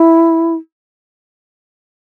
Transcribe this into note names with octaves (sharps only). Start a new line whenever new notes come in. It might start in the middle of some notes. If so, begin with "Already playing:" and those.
Already playing: E4